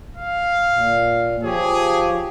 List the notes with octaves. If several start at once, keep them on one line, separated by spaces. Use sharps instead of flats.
F5
A#2
F3 G4 G#4 C#5